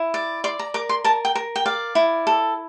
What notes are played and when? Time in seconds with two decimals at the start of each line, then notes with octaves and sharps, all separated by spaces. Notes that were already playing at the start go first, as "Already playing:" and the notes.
Already playing: E4
0.14 D5
0.44 D5 C6
0.59 A#5
0.74 A#4 D6
0.89 C6
1.04 A#4 A5
1.25 G5
1.35 A#4
1.56 G5
1.66 D5 F5
1.95 E4
2.27 A4